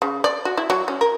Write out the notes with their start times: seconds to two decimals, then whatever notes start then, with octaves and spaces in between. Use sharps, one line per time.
0.02 C#3
0.24 D5
0.45 F#4
0.57 E4
0.70 F#3
0.88 C#4
1.01 A#4